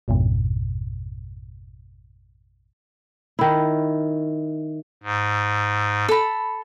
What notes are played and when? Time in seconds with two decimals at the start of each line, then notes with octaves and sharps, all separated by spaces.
0.08 A1 F2 G#2 B2
3.39 D#3 E4
5.03 G#2
6.09 A4 B5